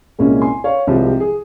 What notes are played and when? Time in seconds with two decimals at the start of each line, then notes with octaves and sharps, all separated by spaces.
0.19 C2 A#2 G#3 C#4
0.41 G#5 C6
0.64 C#5 F5
0.87 C2 C3 F3 G#3 G4
1.04 G4
1.20 G#4